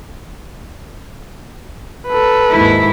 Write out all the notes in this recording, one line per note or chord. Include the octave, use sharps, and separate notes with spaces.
A4 B4
D#2 G#2 E4